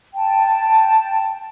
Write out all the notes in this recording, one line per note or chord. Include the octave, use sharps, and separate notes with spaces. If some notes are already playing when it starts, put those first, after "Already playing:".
G5 A5